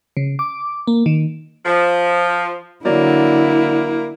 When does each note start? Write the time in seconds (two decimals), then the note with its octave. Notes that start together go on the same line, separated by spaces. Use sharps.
0.17 C#3
0.39 D6
0.87 A#3
1.06 D#3
1.64 F3
2.85 D3 F#3 A#3 E4 D5